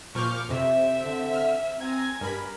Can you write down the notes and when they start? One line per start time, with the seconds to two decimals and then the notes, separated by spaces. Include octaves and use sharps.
0.15 A#2 F3 C#6 D6 F6 G6
0.49 F2 C3 C4 E5
1.03 D3
1.34 F6
1.80 C4 G#5 A#5 G#6
2.21 G2 A#4 B5